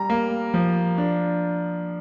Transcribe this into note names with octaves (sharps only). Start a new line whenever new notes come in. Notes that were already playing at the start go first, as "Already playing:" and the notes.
Already playing: G3 A#5
A#3
F3
D4